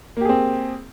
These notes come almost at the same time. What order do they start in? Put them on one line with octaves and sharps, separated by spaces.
A#3 G4 G#4 C4